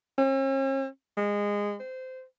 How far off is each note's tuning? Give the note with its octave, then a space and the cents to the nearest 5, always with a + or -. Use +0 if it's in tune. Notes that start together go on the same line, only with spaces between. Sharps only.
C#4 -45
G#3 -20
C5 -20